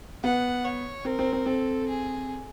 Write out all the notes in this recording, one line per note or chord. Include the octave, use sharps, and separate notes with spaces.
B3 F#5
C#5
C4 A#4
C4
C4
C4 A4
G#4